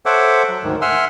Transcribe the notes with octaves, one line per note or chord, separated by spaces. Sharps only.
A4 C5 C#5 E5 F#5 D6
F#3
D2 G#2 D#3
E5 F#5 G#5 C6 E6 F6